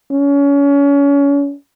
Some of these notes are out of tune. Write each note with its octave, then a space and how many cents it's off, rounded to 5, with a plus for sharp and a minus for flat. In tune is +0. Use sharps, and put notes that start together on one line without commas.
C#4 +30